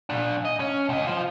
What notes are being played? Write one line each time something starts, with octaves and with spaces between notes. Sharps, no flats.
A#2 D4
D#5
C#4
C#2 D#5
F4 C5